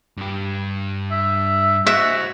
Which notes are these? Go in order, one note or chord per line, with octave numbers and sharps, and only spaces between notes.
G2 G4
E5
F#4 C5 D#5 E5